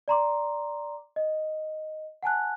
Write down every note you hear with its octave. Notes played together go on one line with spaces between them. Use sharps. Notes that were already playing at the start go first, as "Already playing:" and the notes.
D5 A#5 C6 D6
D#5
F#5 G#5 A5 F#6